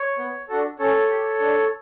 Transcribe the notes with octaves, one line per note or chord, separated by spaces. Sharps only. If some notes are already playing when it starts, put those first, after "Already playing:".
Already playing: C#5
B3
D4 F#4 A4
C#4 A4 C#5
G4
D4